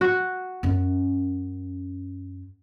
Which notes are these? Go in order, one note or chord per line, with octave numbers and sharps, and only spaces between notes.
F#4
F#2 C#4